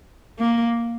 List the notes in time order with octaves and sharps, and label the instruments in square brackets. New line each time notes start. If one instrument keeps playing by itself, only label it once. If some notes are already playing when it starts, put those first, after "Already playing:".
[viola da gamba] A#3